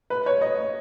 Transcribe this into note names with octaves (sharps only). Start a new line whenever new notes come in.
B4
C#5
D#5